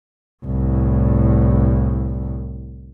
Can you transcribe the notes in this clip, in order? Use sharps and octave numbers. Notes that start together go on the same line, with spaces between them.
C2 A2